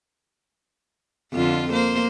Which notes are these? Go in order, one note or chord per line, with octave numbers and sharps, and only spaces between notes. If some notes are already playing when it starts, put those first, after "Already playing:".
F2 D3 F4
A#3 C5